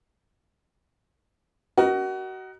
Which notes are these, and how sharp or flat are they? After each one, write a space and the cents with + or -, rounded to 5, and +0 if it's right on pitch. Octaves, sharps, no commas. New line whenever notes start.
F#4 +30 A#4 +30 D#5 +0